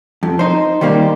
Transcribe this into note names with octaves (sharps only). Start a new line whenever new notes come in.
F2
D#4 C5
D#3 G3 A#3 D#4 C5